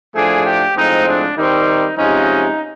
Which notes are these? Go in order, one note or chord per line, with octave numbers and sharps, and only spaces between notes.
A2 F3 A3 D4 G#4
G4
A2 F3 G#3 C4 D#4
D4
D#3 G3 C4 D#4
C3 F3 G#3 C#4 D#4